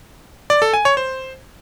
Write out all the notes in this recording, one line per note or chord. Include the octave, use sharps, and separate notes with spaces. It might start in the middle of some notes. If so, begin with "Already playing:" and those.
D5
A4
G#5
C#5
C5